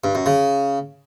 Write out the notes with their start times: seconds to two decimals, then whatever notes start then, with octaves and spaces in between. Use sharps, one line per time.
0.04 G2
0.15 F#2
0.26 C#3